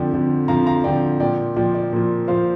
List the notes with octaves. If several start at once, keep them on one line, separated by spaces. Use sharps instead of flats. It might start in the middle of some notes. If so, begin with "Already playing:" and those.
Already playing: F2 D3 F3 D5 G5
F2 D3 F3
F2 D3 F3 F5 A#5
F5 A#5
F2 D3 F3 D5 G5
A#2 F3 D5 G5
A#2 F3 D5 G5
D5
A#2 F3
A#2 F3 C5 F5